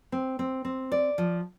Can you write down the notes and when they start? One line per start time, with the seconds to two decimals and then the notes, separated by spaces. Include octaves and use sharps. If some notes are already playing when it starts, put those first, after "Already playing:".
0.12 C4
0.39 C4
0.65 C4
0.92 D5
1.18 F3